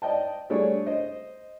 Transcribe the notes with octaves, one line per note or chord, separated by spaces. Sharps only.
D5 D#5 G5 A5
G3 A3 D4 G#4 C#5 D5
C5 D#5